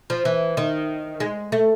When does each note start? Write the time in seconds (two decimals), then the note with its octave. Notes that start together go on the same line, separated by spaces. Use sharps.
0.10 F3
0.25 E3
0.57 D#3
1.20 G#3
1.52 A3